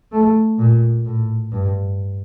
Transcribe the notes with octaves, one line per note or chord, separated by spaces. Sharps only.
A3
A#2
A2
G2